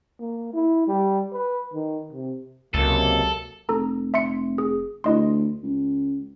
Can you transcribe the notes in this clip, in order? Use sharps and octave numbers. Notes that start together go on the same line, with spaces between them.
A#3
E4
G3
B4
D#3
C3
C#2 C3 F#3 A#3 A4
F1 A4 A#5
E5 C6 C#7
G#4
D2 E4 D#5 C6
C#2